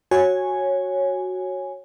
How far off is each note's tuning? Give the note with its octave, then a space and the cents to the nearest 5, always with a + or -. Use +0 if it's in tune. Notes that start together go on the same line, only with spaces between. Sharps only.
F#4 +0 C#5 -10 G#5 +0